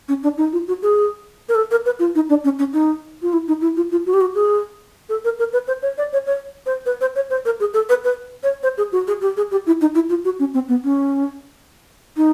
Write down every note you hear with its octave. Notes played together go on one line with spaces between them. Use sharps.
C#4
D4
D#4
F4
F#4
G#4
A#4
A4
A#4
B4
F4
D#4
D4
C#4
C#4
D#4
F4
E4
D#4
E4
F4
F4
F#4
G4
F#4
G#4
A4
A#4
A#4
B4
C5
C#5
D5
C#5
C#5
C5
B4
C5
C#5
C5
A#4
G#4
A4
B4
B4
C#5
C5
G#4
F#4
G#4
G4
G#4
G4
E4
D#4
E4
F4
F#4
C#4
C4
B3
C#4
D#4